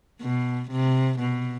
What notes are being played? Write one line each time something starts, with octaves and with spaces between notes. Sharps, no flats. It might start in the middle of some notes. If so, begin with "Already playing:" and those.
B2
C3
B2